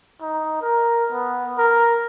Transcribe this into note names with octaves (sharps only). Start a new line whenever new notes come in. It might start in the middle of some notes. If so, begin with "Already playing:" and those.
D#4
A#4
B3
A#4